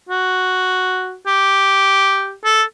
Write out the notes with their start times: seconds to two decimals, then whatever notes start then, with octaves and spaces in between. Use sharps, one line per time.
0.09 F#4
1.27 G4
2.45 A4